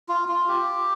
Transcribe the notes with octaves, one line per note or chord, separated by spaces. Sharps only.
F4
F4
G4